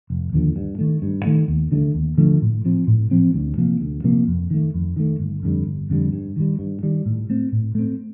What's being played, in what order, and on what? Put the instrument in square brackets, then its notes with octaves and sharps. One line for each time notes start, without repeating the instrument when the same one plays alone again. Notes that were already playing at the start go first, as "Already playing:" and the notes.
[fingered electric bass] F1
D#2 D3 F3
G2
D#3 A3
G2
D#3 A3
D#2
D3 F3 A3
D#2
D3 F3 A3
A2
F3 C4
A2
F3 C4
D2
C3 F3 A#3
D2
C3 F3 A#3
F2
D#3 A3
F2
D#3 A3
G1
F2 D3 G3
G1
F2 D3 G3
G2
D#3 G3
G2
D#3 G3
A2
A3 C4
A2
A3 C4